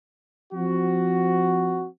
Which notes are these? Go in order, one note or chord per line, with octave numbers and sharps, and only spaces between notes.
F3 C4 F#4